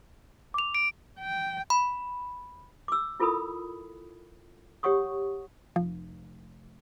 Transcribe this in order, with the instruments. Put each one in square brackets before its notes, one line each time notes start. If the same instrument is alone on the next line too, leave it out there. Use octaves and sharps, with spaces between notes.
[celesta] D6 F7
[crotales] D7
[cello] G5
[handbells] B5
[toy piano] D6 E6
E4 F4 A4 A#4 B5 D#6
G4 C#5 F#5 C#6 D#6
[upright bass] F1 [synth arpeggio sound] F3